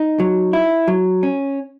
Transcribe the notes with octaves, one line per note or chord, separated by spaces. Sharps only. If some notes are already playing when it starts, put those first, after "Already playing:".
Already playing: D#4
F#3
E4
F#3
C#4